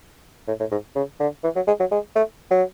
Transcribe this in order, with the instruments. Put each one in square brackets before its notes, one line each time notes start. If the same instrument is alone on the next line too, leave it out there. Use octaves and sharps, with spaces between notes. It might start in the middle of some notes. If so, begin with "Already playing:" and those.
[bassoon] A2
A2
G#2
C#3
D3
E3
F#3
G#3
F#3
G#3
A3
F#3